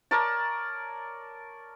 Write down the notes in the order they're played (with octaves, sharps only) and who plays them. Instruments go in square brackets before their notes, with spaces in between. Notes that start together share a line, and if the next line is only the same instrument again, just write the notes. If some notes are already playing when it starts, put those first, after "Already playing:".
[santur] A#4 C#5 D5 A5